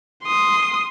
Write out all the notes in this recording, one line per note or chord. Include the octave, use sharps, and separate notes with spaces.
C6 D#6